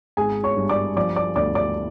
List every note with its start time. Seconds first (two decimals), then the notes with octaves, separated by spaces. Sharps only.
0.17 G#1 G#4 G#5
0.44 C#5 C#6
0.56 G2
0.69 D5 D6
0.96 F3 D5 D6
1.16 D5 D6
1.36 D2 D5 D6
1.55 D5 D6